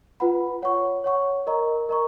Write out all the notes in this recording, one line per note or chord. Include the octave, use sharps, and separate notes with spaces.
F4 B4 F#5 B5
C#5 F#5 C#6
C#5 F#5 C#6
A#4 D#5 A#5 C#6
A#4 D#5 A#5 C#6